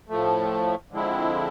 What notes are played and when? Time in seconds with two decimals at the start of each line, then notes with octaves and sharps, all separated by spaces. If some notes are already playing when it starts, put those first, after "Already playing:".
0.09 A2 F3 A3
0.91 D3 F3 G#3 C4 E4